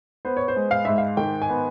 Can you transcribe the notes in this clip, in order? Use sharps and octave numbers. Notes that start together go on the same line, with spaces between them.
B3 C5
C#5
C5
G#3
F5
G#2 E5
F5
D#3 G5
G#5
B3